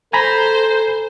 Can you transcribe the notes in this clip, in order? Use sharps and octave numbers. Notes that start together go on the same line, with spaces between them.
A4 C5 G#5 A#5 B5